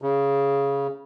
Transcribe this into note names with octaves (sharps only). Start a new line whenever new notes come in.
C#3